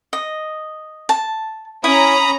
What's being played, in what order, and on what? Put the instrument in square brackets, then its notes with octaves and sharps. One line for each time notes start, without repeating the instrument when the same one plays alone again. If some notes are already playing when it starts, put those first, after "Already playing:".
[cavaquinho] D#5
A5
[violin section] C#4 A#5 [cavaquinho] E4 [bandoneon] B5 D#6